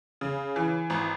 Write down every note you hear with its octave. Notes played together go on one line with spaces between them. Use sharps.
C#3
E3
G#1